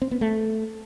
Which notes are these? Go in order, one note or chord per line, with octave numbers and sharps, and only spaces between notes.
C4
B3
A3